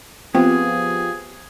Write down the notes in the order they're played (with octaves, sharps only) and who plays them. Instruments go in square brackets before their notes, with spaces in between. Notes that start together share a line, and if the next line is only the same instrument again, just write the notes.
[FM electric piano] F3 F4 G4 [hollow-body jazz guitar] B3 [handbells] C4 [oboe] G#4